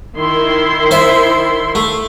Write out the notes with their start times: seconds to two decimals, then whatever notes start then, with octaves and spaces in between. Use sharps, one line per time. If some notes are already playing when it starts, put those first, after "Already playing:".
0.17 D#3 E4 C6
0.91 C5 E5
1.75 A3